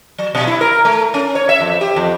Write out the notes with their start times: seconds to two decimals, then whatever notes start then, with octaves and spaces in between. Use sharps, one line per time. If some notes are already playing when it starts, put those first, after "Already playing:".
0.18 F#3
0.35 B2
0.47 E4
0.61 A#4
0.85 A3
1.14 C#4
1.35 C#5
1.49 E5
1.61 F2
1.81 G4
1.96 F2